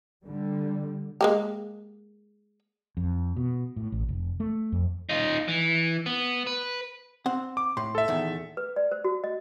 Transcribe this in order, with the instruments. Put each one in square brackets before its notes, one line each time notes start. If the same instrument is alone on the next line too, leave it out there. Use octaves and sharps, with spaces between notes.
[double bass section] D3 G3
[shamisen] G#3 A#3 G4
[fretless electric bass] F2
B2
A2
A1
F1
A3
F2
[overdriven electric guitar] D#4 F4
E3
B3
B4
[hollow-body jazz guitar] C4 F#5
[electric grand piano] D6
[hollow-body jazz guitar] A2 [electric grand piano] C6
[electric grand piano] A4 E5
[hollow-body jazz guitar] E2 A#2 D#3
[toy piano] B4
D5
C5
F#4
D#5